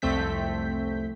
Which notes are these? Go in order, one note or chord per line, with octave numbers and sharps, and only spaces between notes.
C2 F2 A3 C4 G6 B6